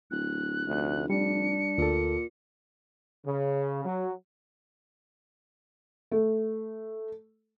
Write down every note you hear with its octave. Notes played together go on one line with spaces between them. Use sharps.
D1 F#6
F1 D2
G3 D4 C#7
D2 A#2 A4
C#3
F#3
A3